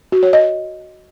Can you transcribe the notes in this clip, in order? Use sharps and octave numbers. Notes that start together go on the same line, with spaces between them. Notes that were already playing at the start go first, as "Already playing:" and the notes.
F#4
C#5
D#5